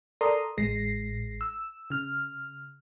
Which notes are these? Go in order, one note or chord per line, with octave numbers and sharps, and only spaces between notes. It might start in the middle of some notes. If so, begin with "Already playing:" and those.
A4 A#4 D5 A#5 C6 D#6
A1 G#3 A#6 C7
E6
C#3 F6